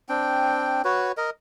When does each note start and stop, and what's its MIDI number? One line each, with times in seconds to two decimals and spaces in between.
0.09 0.82 60
0.09 0.82 62
0.09 0.82 79
0.84 1.12 66
0.84 1.12 71
0.84 1.12 73
1.17 1.30 70
1.17 1.30 75